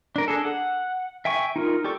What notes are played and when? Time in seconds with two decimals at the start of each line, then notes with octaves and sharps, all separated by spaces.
0.16 D4 A#4
0.28 D4 G#4 A4
0.45 F#5
1.25 E5 G5 G#5 C#6
1.56 D#4 F4 A#4
1.84 G4 A4 D5 C#6